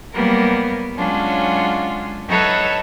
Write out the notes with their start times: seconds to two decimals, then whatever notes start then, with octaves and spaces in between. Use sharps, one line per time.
0.13 F#3 G3 A#3 B3 A#4
0.97 F#3 G#3 C#4 D4 F4
2.28 F#3 D#4 A4 B4 C#5 E5